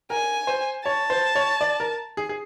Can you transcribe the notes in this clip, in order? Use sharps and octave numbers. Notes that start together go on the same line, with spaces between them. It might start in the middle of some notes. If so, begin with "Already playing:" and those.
A#4 G#5
C5
C#5 A5
C5
C#5
D5
A#4
G#4
G#4